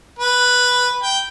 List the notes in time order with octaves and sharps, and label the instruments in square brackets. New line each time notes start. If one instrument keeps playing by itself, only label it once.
[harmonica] B4
G5